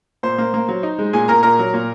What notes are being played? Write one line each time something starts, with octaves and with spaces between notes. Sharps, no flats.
A#2 C5
A#3
A#3
F#3
D#4
G#3
A#2 G#4 G#5
A#2 A#4 A#5
A#2 A#4 A#5
F#3
A#2